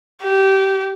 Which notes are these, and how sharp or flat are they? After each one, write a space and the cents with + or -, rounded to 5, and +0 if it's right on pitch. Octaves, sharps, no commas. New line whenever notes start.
G4 -20